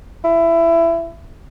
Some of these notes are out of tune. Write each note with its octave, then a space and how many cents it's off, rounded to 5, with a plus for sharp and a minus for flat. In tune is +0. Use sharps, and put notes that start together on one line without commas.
E4 +20